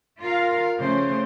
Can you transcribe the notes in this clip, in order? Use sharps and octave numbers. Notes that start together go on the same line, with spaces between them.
F4 A#4 F5
C#3 F3 A3 C5